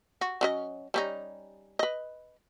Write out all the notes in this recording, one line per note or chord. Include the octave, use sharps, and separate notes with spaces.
F#4
F#3 C#4 D#5
G3 C#4 D#4
B4 D#5